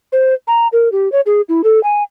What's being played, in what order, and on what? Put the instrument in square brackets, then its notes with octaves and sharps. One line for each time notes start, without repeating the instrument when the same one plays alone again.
[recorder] C5
A#5
A#4
G4
C#5
G#4
E4
A4
G#5